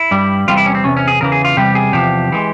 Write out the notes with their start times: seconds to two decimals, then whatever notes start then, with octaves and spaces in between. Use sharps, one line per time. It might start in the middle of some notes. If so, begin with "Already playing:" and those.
Already playing: E4
0.11 G2 G3
0.48 E2 C3 G3 F4
0.57 E4
0.66 C#4
0.75 C4
0.84 E2 C3 C#4
0.97 C#4
1.08 G#4
1.20 E2 C#3 E3 A#4
1.32 G#4
1.45 F4
1.56 E2 C3 G3 G4
1.75 G#4
1.92 E2 C3 F3 G4
2.32 E3 G#3